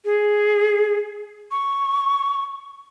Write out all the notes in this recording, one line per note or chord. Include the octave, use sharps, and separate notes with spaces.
G#4
C#6